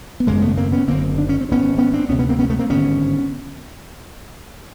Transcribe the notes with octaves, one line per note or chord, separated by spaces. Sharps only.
B3
G#1 F#2 C#3 G#3 A#3
A3 B3
A#3 C4
B3 C#4
F#1 F#2 D3 A#3 C4
D4
C#4
C4
G#1 G2 D3 B3 C#4
B3 C#4
C4 D4
D2 C3 B3 C#4
B3 C#4
A#3 C4
B3 C#4
A3 B3
A#3 C4
G#1 G2 D3 B3 C#4